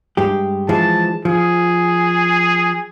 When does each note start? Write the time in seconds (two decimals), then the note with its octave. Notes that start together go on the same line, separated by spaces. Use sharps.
0.17 G2 G#3 G4
0.69 E3 F3 G#3 A5
1.25 F3 G#4